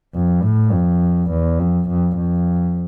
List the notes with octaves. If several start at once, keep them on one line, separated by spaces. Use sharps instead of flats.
F2
A2
F2
E2
F2
F2
F2